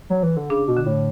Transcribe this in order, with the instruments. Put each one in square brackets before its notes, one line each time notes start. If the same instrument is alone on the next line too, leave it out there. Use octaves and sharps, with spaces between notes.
[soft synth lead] F#3
E3
D3
[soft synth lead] C#3 [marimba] D4
[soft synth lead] B2
[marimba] D3
[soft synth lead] A2